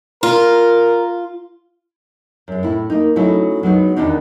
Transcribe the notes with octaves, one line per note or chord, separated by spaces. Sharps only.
F4 A#4
F#2 G#3
A2 E4
A#3 D#4
C#3 F#3 A3 D#4 E4
F#3 G#3 B3 D#4
E2 D#3 G#3 D4 D#4